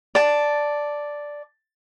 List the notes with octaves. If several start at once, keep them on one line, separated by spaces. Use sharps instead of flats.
D5 A5